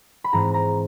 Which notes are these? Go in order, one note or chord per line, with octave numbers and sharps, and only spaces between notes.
B5
G#2 E3 G#3 C4 A#5
A#5